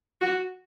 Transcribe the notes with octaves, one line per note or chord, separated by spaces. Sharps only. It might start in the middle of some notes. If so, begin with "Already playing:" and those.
F#4